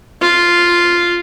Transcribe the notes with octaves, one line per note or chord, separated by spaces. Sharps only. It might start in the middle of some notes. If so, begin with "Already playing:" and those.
F4